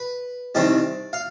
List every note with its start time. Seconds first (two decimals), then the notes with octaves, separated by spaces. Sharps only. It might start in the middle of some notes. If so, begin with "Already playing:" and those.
Already playing: B4
0.55 C2 C3 D#3 D5
1.13 F5